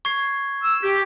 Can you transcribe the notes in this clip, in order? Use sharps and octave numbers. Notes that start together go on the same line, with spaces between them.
C#6 G#6 C7
E6
G4